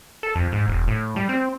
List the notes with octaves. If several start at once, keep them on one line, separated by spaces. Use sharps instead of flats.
A4
F2
G#2
E1
A2
G3
C4